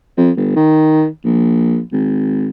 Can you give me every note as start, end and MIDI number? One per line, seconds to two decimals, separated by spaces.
0.18 0.31 41
0.37 0.51 31
0.56 1.06 51
1.24 1.80 34
1.92 2.50 32